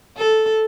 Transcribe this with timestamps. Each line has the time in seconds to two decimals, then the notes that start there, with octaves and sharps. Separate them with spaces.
0.18 A4